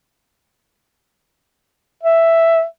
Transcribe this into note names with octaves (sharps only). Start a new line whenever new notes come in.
E5